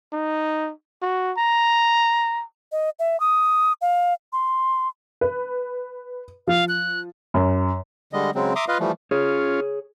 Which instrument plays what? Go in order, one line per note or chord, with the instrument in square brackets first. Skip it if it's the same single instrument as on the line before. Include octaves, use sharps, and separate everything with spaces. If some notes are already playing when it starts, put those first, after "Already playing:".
[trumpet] D#4
F#4
A#5
[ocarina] D#5
E5
D#6
F5
C6
[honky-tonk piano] B4
[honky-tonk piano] F3 [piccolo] F5
[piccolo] F#6
[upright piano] F#2
[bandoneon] D3 G3 G#3 D#5
C#3 F#3 G#3 C4
E5 A#5 C6 D6 D#6
F4 B4 D#5 F5
E3 F3 G3 A3
[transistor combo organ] C#4 F4 [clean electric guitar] G#4 C#5